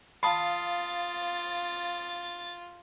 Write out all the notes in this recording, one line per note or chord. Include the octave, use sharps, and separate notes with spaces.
F4 F5 A5 B5 D#6 A6 C7